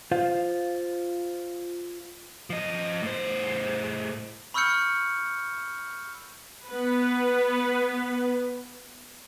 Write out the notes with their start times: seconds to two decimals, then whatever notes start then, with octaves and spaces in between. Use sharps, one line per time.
0.11 F4 C5 F5
2.50 F3 D#5
3.02 A2 C5
4.54 B5 C#6 E6 F6 G6 C#7
6.68 B3 B4